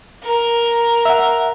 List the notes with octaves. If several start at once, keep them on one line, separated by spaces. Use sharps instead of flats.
A#4
E5 F#5